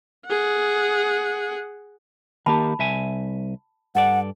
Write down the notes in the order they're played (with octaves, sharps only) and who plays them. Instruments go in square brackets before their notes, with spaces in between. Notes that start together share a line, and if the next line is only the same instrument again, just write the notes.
[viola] G#4 F#5
[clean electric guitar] D#3 A#3 G4 [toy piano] A5 B5
[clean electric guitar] C2 E5 G#5
[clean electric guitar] G2 A4 D5 [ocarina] F#5